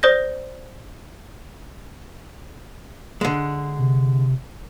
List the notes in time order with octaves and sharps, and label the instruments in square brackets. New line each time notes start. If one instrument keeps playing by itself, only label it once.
[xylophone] C5 D5 D#6 G6 A#6
[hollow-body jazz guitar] D3 G#3
[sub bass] C3